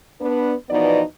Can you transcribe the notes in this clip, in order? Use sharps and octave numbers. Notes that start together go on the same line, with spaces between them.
B3 D4 B4
B2 E3 F3 B3 D#4 D5